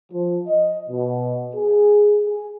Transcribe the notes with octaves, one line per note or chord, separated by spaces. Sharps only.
F3
D#5
B2
G#4
G#4